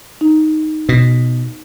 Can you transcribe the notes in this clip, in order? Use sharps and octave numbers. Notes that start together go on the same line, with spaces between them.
D#4
B2